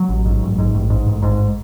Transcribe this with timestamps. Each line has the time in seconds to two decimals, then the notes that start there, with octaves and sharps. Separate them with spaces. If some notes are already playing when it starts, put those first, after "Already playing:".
Already playing: F#3
0.09 A1
0.26 G#2
0.43 A1
0.58 G#2
0.75 A1
0.90 G#2
1.07 A1
1.22 G#2